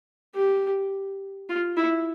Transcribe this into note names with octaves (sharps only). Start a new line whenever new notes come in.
G4
F4
E4